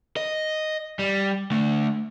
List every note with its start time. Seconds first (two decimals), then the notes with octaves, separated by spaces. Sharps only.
0.17 D#5
0.99 G3
1.51 D3 A3